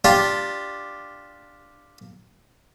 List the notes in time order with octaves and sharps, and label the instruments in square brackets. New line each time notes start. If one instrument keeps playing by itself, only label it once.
[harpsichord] D4 F4 G4